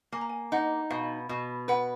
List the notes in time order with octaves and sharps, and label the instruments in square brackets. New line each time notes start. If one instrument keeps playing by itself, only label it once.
[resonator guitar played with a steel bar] A#3 [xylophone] G#5
[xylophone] A#5
G#5
[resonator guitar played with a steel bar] D#4 [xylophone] F#5
[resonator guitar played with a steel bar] B2 [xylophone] F5
[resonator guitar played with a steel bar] B2
[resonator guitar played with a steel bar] B4 [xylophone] F#5